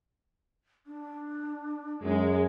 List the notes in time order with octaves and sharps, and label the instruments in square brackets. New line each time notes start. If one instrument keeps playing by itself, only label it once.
[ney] D4
[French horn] F#2 [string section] G#3